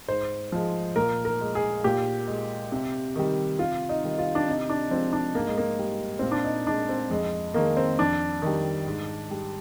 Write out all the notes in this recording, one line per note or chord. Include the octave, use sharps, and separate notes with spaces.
G#2 C5
F3 G#3
A#2 A#4
A#4
G#3
G#4
A#2 G4
G#3
C3
D#3 G3
C3 F4
D#4
D#3 G3
F4
D4
C3 D#4
D4
F3 G#3 C4
D4
G#2 A#3
G#3
A#3
G3
A#2 C4
D4
D#4
G#3 D4
C4
F2 G#3
D#3 G#3 A#3
C4
F2 D4
D#3 G3
G#2
G3